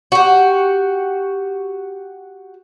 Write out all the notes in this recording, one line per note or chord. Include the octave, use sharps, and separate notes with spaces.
F#4 G4